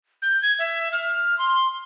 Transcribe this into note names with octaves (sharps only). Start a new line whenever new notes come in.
G6
G#6
E5
F6
C6